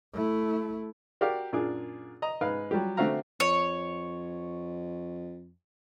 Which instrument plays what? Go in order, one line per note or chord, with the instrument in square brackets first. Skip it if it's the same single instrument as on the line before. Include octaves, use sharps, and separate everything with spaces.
[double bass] A3 E4
[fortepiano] F#4 G4 A#4 D5 F5
F#2 A#2 D4 F4 G#4 D6
D#5 A#5
G#2 G#3 B4 F5
F#3 G3 F4 G4
D3 A3 C4 F#4 F5 A#5
[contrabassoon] F2 [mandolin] C#5